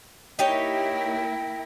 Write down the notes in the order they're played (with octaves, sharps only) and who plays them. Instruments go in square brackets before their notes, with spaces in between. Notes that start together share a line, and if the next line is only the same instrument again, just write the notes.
[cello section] A#3 E4 A#4 [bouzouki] D#4 G4 C#5 [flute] G5